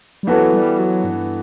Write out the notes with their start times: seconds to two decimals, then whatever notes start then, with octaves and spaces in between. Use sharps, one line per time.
0.23 G3
0.27 E3 F#3 B3 F#4 A4
0.53 G3
0.79 F#3
1.04 G2